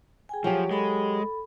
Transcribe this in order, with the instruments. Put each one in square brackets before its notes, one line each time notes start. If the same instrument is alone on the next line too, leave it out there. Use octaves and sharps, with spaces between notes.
[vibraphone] G#4 G5 G#5
[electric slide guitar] F3 [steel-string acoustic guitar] F#3 G4
[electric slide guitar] G#3 [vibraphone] A4 B5